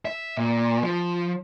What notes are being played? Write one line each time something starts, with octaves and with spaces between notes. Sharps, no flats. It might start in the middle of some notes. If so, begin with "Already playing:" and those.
E5
A#2
F3